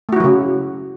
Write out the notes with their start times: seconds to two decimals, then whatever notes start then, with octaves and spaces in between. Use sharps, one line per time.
0.09 A3
0.13 F#4
0.16 E4
0.20 F#3
0.24 C#3